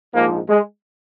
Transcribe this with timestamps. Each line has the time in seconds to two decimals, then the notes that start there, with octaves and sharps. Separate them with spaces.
0.14 A#1 G#2 F3 G#3 A#3
0.49 G#3